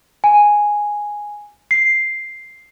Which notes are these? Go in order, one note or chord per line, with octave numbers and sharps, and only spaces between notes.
G#5
C7